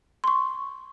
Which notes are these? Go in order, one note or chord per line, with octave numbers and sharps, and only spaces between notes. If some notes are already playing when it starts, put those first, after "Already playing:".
C6 C#6